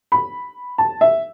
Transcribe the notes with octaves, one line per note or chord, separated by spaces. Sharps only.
B5
A5
E5